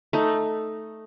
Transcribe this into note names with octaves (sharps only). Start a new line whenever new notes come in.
A3 D#4